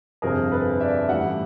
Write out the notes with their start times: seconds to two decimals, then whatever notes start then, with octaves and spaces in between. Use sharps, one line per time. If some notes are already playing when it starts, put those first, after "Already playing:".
0.22 G1 F2 C3 G#4 A#4
0.52 A4 B4
0.80 D5 E5
1.09 A1 A2 E3 G3 E5 F#5